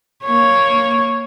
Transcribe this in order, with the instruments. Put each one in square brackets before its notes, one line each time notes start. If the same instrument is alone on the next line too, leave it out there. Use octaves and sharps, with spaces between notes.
[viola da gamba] A#3 C#5